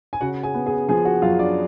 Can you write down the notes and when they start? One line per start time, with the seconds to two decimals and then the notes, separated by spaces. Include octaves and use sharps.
0.13 G#5
0.21 C#3 F#4 F#5
0.43 G#4 G#5
0.54 B3
0.66 G#4 G#5
0.89 F3 G#4 G#5
1.05 F#4 F#5
1.22 F#2 F4 F5
1.39 D4 D5